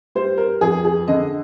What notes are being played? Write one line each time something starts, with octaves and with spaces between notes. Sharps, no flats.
G3 C5
A#4
F2 G#4
G#4
D3 D#5